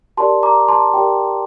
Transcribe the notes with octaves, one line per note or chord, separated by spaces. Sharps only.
G4 A#4 D5 A5 C6
A#5 D6
A5 C6
G4 A#4 D5 G5